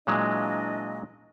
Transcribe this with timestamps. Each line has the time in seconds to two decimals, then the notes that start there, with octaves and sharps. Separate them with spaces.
0.07 A#2 E3 F#3 G#3 D4 D#5